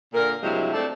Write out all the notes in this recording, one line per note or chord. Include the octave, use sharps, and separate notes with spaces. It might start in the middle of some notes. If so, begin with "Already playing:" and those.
A#2 D3 A#4
G2 C3 F3 F#3 G#3 E4
A3 C4 D4 A4 D5